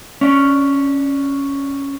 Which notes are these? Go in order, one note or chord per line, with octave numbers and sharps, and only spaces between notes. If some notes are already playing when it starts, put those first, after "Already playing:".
C#4 D4